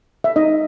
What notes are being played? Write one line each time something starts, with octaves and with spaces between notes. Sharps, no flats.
E5
D#4 D#5